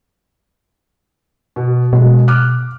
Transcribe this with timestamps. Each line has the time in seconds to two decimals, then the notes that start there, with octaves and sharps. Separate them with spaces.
1.56 B2
1.93 B2 F#3 G#3
2.28 D6 F6 F#6